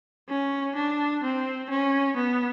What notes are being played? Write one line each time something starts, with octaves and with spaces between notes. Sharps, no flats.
C#4
D4
C4
C#4
B3